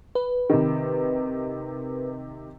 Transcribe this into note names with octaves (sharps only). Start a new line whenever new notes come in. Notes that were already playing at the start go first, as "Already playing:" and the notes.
B4
C3 D#3